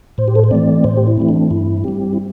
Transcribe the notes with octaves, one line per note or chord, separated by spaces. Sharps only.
A2 C5
G4
A4
C5
E3 A3 C4 D5
A2 C5
G4
E4
E3 A3 C4
D4
G2 E4
G3 C4 G4
E4